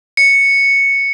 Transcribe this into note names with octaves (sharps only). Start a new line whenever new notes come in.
C#7